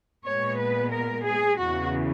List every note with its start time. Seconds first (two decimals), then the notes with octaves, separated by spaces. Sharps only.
0.26 A#2 G#3 B3 C#5
0.58 B4
0.92 A#4
1.25 G#4
1.58 E2 C#3 E3 F#4